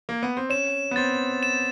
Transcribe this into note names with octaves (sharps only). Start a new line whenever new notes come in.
A#3
B3
C4
C#4 E7
B3
C4 A6
E7